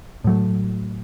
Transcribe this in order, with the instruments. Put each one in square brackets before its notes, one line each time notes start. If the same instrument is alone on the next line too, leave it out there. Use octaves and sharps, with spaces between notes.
[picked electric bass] A2 F#3 A3